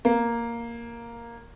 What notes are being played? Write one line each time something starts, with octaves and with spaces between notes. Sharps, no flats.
A#3